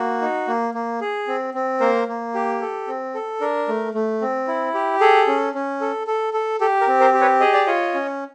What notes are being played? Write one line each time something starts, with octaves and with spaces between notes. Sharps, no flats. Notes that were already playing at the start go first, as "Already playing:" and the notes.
Already playing: A#3 F#4
D#4
A#3
A#3
G#4
C4
C4
A#3 A#4 C5
A#3
G4
A4
C4
A4
D4 A#4
A3
A3
C4
E4
G4
G#4 A4
C#4
C#4
A4
A4
A4
G4 A4
A#4
C4
A#4 C5
G4
B4 C#5
G#4 D#5
D5
F4 C#5 D#5
C#4